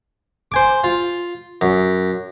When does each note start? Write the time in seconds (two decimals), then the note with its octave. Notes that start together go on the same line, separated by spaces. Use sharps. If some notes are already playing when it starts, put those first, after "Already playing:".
0.52 C5 G#5 D6
0.84 F4
1.61 F#2